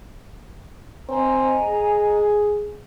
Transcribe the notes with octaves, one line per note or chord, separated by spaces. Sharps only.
C4 D#5 G#5 A#5
G#4